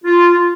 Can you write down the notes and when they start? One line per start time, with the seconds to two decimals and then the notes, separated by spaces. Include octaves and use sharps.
0.05 F4